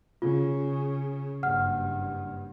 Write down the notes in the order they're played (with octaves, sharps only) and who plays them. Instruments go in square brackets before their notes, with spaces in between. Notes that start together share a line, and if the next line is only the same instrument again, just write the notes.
[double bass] C#3 [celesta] F4
[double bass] F#1 G2 [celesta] F#5 F6